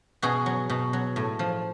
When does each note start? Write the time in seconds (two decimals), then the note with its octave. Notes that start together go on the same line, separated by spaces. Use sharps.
0.22 B2 F#4 G#4
0.46 F#3
0.70 B2
0.93 F#3
1.16 A2
1.39 F3